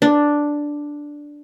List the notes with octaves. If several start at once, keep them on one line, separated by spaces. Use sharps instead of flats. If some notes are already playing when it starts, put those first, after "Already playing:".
D4